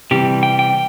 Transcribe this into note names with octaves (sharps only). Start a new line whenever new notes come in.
C3 E3 G3 G4
G5
G5